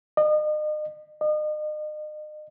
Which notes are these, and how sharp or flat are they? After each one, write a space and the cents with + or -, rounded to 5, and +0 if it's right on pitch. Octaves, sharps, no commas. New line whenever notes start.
D#5 -40
D#5 -40